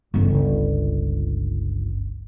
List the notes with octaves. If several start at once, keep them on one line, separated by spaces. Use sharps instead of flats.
G1 C#2